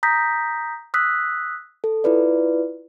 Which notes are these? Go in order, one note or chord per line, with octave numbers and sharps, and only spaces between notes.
A#5 D#6 G6 A#6 B6
D#6 E6 F#6 B6
A4
E4 F4 B4 D5